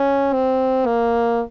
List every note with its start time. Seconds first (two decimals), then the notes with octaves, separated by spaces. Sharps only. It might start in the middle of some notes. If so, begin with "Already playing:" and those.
Already playing: C#4
0.33 C4
0.86 A#3